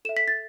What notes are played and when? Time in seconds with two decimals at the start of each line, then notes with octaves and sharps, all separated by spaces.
0.05 A4 E7
0.09 E5
0.17 B6
0.28 A6